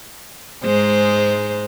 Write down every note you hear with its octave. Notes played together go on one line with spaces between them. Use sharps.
G#2 G#3 C5